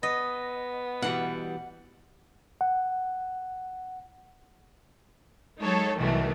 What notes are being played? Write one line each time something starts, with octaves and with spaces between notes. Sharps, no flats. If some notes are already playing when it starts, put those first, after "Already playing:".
B3 D#5
B2 E3 G3 F#5
F#5
F#3 G#3 D#4 A4 C#5
C2 B2 D#3 E3 F#3 A3